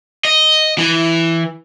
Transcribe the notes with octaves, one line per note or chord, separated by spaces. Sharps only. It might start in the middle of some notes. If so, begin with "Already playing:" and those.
D#5
E3